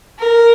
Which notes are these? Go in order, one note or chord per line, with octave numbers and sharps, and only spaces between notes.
A#4